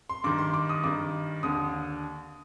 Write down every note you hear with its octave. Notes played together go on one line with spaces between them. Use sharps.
C6
G2 D#3 D6
C6
D6
D#6
G2 D#3 D6
D#2 D3 D#6